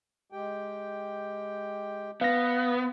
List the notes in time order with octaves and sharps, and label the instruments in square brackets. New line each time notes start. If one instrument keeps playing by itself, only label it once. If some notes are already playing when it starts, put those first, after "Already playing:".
[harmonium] G#3 G4 G5
[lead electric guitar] B3 [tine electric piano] F5 A#6